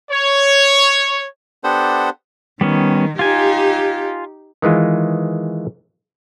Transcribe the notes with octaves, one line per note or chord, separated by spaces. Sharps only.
C#5
B3 D4 G4 A4 C5 F#5
D#3 G3 B3 C#4
D#4 F4 G4 G#5
D#3 E3 G#3 F4